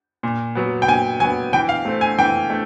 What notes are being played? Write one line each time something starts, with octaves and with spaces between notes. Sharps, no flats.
A#2
F#3 B3
G5
A#2 G#5
F#3 B3 G#5
E3 G5
F5
A3 C4
G#5
E3 G5
A3